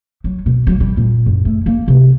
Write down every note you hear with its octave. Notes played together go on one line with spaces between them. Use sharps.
F#3
B2
F#3
G3
A#2
F#2
A3
A#3
C3